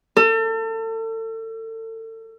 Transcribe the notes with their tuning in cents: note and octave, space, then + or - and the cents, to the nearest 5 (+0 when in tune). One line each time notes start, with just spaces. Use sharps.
A4 +35